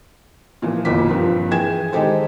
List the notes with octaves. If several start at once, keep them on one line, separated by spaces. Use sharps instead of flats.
A#2 E3 F3
F#1 B1 A#2 D#3 D6 B6
G2 F3 A#3 C4
E3 G#4 G5 G#5 G#6 E7
D#3 G#3 D#4 G4 A4 C5